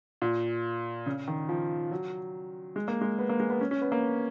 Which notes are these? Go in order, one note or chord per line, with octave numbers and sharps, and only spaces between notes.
A#2
C#3
D#3
F3
F#3
G#3
A#3
G#3
B3
A#3
G#3
B3
C#4
C#4
B3
A#3